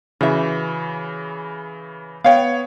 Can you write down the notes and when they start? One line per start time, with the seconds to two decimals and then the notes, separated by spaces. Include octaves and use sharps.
0.21 C#3 E3 F#4 E5
2.24 B3 C#5 F5 G5